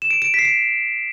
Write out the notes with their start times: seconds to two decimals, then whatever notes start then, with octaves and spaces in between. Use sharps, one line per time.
0.02 E7
0.11 D7
0.22 D7
0.34 B6
0.39 C7
0.45 D7